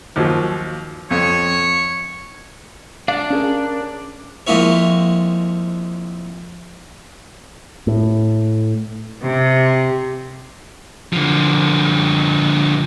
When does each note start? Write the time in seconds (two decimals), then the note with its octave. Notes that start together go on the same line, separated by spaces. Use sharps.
0.16 D#2 F3 F#3
1.11 F2 C#5
3.08 D4 F5
3.30 C#4 G#4 A#4
4.47 F2 G#3 A#3 E4 C#5
7.87 A2
9.22 C3
11.13 D3 F3